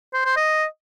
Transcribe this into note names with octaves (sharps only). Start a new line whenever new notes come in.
C5
C5
D#5